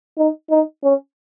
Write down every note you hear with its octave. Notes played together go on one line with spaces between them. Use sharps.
D#4
D#4
C#4